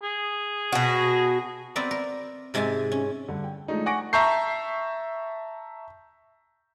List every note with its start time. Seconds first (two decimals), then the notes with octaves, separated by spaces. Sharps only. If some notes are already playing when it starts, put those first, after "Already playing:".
0.03 G#4
0.72 B2 F#4
1.76 B3 C4 A#4 D5 E5
1.91 A#4
2.54 G#2 C3 G#3 E5 G#5 A5
2.92 C#4
3.28 G2 D3
3.44 G5
3.68 F3 G#3 A3 D4 D#4
3.86 F#5 G#5 C#6 D6 A#6 D7
4.13 E5 A5 A#5 C#6 G6 C7